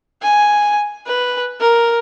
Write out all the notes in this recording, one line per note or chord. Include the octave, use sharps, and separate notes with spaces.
G#5
B4
A#4